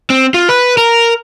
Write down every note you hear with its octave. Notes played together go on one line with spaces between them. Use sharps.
C4
F4
B4
A#4